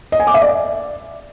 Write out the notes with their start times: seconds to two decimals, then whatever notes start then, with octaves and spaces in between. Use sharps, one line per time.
0.12 D#5
0.20 G#5
0.27 D6
0.34 E5
0.42 D5